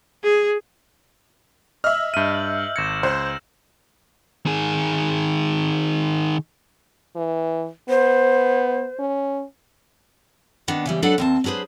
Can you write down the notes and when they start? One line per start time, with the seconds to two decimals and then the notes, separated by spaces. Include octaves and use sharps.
0.24 G#4
1.84 D#5 E5 E6 F6
2.14 G2 F6 G6 D#7
2.34 F6 F#7
2.76 G#1 G#6 A#6 C#7 E7
3.03 C#2 C5
4.46 D#3 G#4
7.16 E3
7.89 B3 C5
8.99 C#4
10.68 D#3 B3 D4
10.86 C#3 E3 G3
11.02 F#3 D4 A4 B4 F#5
11.18 D#2 C4 A5
11.44 F#3 D4 G#4 B4 C5